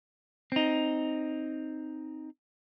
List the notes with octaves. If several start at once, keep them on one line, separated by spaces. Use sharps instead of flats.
C4 D#4